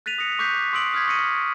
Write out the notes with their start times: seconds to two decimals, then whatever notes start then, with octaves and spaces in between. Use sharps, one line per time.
0.06 F#6 A6 B6 D#7 F7
0.18 D#6 A#6 C#7
0.39 C#6 D6 F#6 G6 B6 C7
0.73 C6 D#6 E6 C7 D7 F#7
0.93 D#6 F6 G6 G#6 B6
1.07 C#6 A#6 C#7 D#7